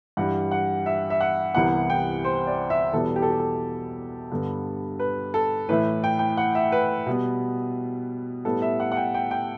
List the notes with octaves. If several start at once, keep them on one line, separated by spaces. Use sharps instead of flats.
G2 E3 G3 F#5
F#5
E5
E5
F#5
C2 C3 E3 G3 B3 F#5
G5
C5
D5
E5
E2 B2 G3 B3 A4
G4
A4
G4
A4
G2 D3 G3 B3
B4
A4
A2 E3 A3 B4
G5
G5
F#5
E5
B4
B2 G3 B3
A2 G3 B3 A4
E5
F#5
F#5
G5
G5
G5